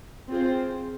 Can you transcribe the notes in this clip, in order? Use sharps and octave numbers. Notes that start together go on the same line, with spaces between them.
C4 F4 G#4 C5